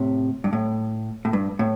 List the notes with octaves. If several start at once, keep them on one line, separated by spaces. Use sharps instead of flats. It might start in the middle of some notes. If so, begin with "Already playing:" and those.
Already playing: A2 C3
G2
A2
A2
G2
A2